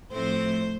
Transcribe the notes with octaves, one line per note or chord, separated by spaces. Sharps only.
A2 F3 A3 C4 C5